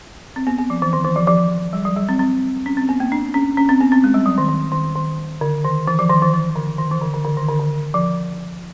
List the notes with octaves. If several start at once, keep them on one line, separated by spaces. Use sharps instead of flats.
C4
B3
B3
F3
E3
D#3
E3
F3
F3
G3
F#3
G3
C4
C4
C#4
C4
B3
A#3
D4
C#4
C#4
C4
B3
C4
G#3
G3
F#3
D#3
D#3
D#3
D#3
D3
D#3
E3
F3
D#3
E3
E3
D3
D#3
E3
D3
D3
D3
D#3
D3
D3
F3